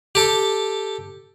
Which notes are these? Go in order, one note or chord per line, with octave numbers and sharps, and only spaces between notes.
G4 A4